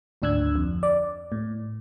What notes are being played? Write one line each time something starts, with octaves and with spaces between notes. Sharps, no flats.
G#1 D2 D4 E6 F#6 G#6
F2
D5
A2